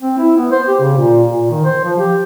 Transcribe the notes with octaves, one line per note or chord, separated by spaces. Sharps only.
C4
E4
B3
C5
G4
C#3
A#2
A#2
D#3
C5
F3
G4